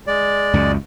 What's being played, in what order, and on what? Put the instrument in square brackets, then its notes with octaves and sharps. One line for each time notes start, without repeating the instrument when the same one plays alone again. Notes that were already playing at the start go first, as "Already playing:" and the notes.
[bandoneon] G#3 D5
[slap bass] C#2 F#2 C#3